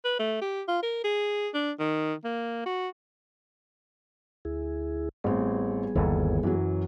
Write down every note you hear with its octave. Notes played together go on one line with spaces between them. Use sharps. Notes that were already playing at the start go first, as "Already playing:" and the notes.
B4
A3
G4
F4
A#4
G#4
D4
D#3
A#3
F#4
D2 E4 G#4
A1 G3 B3 C4 G#4
G1 D#2 E3 A4
F#2 E3 F#3